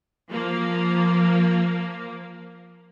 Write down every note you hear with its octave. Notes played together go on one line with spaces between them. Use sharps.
F3 A#3